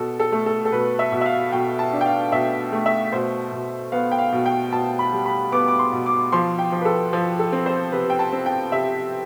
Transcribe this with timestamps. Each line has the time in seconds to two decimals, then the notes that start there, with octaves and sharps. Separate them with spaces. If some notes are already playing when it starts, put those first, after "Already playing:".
Already playing: B2 A4
0.20 A4
0.32 A3
0.46 A4
0.65 A4
0.72 B2 B4
0.99 E5
1.12 B2
1.21 E5
1.26 F5
1.52 B2 G5
1.79 A5
1.93 D4
2.01 G5
2.06 F5
2.32 B2 E5
2.73 A3
2.86 E5
3.12 B2 C5
3.52 B2
3.92 B3 F5
4.12 G5
4.19 F5
4.32 B2
4.46 G5
4.72 B2 A5
4.99 B5
5.13 G3
5.26 B5
5.52 B3 D6
5.68 D6
5.79 C6
5.92 B2
6.06 D6
6.32 F3 C6
6.59 G5
6.72 F3
6.81 B4
6.85 A4
7.13 F3
7.39 A4
7.52 C4
7.66 C5
7.92 C3 B4
8.10 G5
8.19 A5
8.33 C4
8.46 G5
8.72 C3 E5